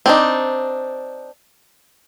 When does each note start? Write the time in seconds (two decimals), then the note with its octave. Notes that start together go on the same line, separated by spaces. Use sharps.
0.06 C4 D4 D#4